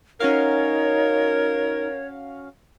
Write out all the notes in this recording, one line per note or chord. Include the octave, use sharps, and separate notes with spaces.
C#4 D#4 F#4 A#4 C#5 F5